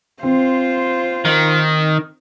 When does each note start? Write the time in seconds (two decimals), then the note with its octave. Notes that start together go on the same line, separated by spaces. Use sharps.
0.23 C4 F4 C5
1.25 D#3